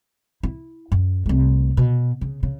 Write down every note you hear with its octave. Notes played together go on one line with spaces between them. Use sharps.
E4
F#2
C2 A3
B2
C#3
C#3